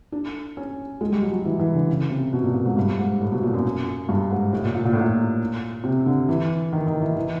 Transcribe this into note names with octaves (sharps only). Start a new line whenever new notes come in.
D4
C#4
G#3
G3
F#3
F#3
E3
E3
D3
C#3
C3
B2
A#2
A#2
G#2
G2
G#2
A2
B2
A#2
F#2
G2
G#2
A2
A#2
A#2
A#2
A2
A#2
C3
D3
E3
D#3
D#3
E3
E3